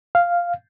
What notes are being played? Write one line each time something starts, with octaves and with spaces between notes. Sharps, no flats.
F5